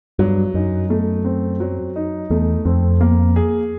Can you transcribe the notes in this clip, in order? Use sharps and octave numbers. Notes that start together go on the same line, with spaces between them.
G2 F#3
F#2 D#4
A3
C4
F#3
D#4
E2 A3
F2 C4
A#3
G#4